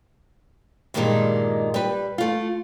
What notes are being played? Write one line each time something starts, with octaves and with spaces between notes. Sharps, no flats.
G2 A#2 D#3 F3 G3 G#3
G3 B4
A3 F4